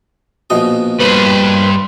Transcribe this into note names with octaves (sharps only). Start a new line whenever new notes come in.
A#1 B2 D#5
G2 B4 C5 B5